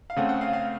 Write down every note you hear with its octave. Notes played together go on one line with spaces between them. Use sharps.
F5
C#3 A3 C4 F#5
F#5
F5
F5